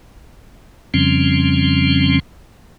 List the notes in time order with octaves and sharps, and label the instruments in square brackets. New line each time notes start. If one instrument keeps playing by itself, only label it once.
[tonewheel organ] F2 C#3 F3 G3 C4 C#4